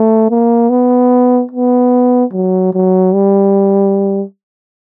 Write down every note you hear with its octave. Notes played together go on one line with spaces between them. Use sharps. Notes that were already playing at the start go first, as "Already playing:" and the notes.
Already playing: A3
A#3
B3
B3
F#3
F#3
G3